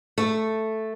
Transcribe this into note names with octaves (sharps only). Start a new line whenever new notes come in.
A3